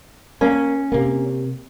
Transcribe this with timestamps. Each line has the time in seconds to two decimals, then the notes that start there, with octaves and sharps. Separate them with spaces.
0.41 A#3 C#4
0.92 C3 A#3